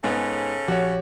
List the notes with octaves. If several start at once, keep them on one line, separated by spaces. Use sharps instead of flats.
G#2 C#3 B3 C#4 A4
A#1 F3 F#4 G4 C#5